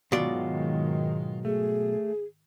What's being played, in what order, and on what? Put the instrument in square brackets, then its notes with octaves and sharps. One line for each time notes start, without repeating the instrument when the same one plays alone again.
[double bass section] G#2 D#3 G#3 [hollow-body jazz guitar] B2 F#3 D5 [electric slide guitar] F4
[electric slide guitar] A3 [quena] G#4